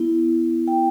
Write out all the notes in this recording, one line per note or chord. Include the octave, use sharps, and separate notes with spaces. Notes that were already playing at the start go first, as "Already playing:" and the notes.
Already playing: B3 E4
G5